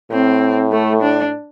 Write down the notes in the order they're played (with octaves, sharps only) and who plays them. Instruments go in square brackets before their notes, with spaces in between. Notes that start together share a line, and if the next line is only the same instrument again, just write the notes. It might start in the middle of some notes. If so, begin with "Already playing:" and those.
[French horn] A2 [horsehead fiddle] C4
[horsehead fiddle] A3
D4